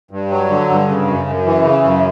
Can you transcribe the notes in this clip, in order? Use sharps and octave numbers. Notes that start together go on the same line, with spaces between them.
G2
F#3
D3
G2
C#3
F#2
F#2
E3
C#3
F#2